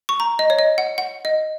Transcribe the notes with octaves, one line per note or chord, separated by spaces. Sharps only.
C#6
A#5
D#5
C#5
D#5
F#5
F#5
D#5